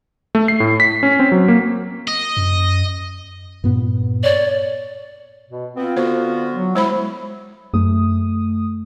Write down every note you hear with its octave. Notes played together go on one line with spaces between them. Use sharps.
A3
C7
A2
B6
C#4
C4
F#3
A#3
D#5
F#2
G2 A#2 B3
C#5 D5
B2
B3 C4 F4
D3 B3 F#4 C5
F#3
G#3 E4 C5 B5
F#2 A3 D#6